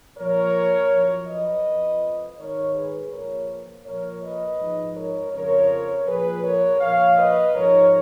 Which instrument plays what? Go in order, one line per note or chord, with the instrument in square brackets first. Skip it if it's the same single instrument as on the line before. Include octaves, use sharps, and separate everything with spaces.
[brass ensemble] A#2 F3 A#4 C#5
F#2 F3
B4 D#5
F2 F3
G#2 D#3 A#4 C#5
G#4 B4
A#2 F3 A#4 C#5
A#2 F3 A#4 C#5
B4 D#5
G#2 F3
A#4 C#5
F2 C#3 F3 A#4 C#5
A#2 F3 G#4 B4
A#4 C#5
A#2 F3 C#5 F5
B4 D#5
G#2 F3 A#4 C#5